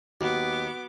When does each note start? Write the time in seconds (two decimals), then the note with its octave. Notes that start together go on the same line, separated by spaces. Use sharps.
0.21 D#2 B3 F#4 D6